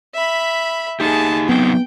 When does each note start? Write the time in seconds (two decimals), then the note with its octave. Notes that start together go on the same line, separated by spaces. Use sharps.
0.14 E5 B5
1.00 D#4 G4 G#4 A5
1.49 F#3 B3 C4 D#4 G5